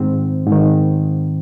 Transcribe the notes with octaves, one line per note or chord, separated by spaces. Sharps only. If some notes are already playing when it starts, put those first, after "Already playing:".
Already playing: G#2 D#3 C4
G#2 D#3